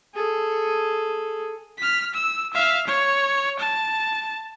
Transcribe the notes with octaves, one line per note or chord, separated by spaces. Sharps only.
G#4 A4
F6 B6
E6
E5 F5
C#5
A5